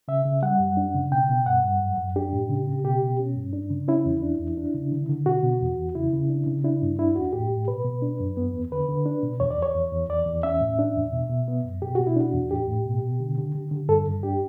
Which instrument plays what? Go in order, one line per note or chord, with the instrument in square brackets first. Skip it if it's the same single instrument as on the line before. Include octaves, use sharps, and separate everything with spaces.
[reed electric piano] C#3 E5
C#3
G3 F#5
F#2
D4
C#3
B2 G5
B2
G2 F#5
G2
F#2
F#2
D4 G4
A2
C#3
C#3
B2 G4
B2
C#4
G2
D4
C#3
C#4 E4
E2
D4
E2
D4
C#3
D3
D3
B2 F#4
B2
E2
E2
C#3 E4
C#3
D4
C#3
D4 E4
G2
D4 E4
E2 F#4
A2 G4
A2
B2 B4
B2
D4
F#2
B3
E2
D3 B4
D3
D4
B2
E2 C#5
D5
E2 C#5
E2
E2
E2 D5
E2
C#4 E5
A2
D4
E2
B2
B2
B3
F#2
B2 G4
B2 F#4
E4
D4 F#4
E2
A2 G4
A2
B2
B2
D3
D3
D3
D3
G2 A4
G2
D4 G4